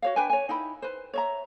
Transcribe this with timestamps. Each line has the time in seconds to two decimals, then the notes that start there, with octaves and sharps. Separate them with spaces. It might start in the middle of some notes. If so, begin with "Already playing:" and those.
0.02 F#4 C#5 F5
0.16 D4 B4 G5 G#5
0.29 C#5 G#5
0.49 D#4 E4 G5 B5
0.82 B4 C5
1.13 C#5 E5 A#5